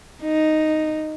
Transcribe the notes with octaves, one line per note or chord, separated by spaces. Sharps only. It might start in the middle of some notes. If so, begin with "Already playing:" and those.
D#4